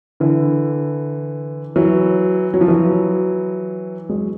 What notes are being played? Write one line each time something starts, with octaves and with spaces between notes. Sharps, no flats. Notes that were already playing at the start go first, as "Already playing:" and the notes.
D3 E3
E3 F#3
F#3
F3
E3 F#3
F#3 G#3